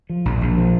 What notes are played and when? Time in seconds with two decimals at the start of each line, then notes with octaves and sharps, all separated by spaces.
0.09 F3
0.25 A#1
0.41 A#1
0.57 F3